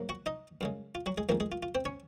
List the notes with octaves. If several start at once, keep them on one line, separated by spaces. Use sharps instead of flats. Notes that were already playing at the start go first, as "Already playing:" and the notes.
Already playing: G#2 F#3 A#3
F#4 F#5
D#4 D#5
F#2 C#3 G#3
F4
F#3 F#4
G#3 G#4
F2 D#3 G#3 A#3 A#4
G#3 G#4
F4
F4
C4 C5
C#4 C#5